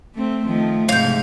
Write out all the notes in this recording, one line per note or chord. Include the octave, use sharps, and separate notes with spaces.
A3 C4
D#3 F3 A3
G#2 C3 F5 G6